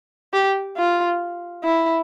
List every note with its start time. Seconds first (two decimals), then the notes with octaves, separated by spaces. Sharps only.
0.33 G4
0.77 F4
1.64 E4